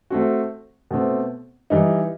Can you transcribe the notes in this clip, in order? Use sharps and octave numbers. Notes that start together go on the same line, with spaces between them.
A3 C4 F#4
B2 A3 C4
E3 G3 D#4